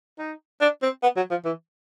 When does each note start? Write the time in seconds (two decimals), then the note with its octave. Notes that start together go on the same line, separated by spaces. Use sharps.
0.19 D#4
0.61 D4
0.82 C4
1.03 B3
1.17 F#3
1.31 F3
1.45 E3